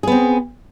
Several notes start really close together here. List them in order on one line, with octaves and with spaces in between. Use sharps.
G#4 B3 C4